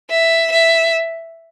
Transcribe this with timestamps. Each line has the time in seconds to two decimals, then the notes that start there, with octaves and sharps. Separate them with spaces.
0.10 E5
0.52 E5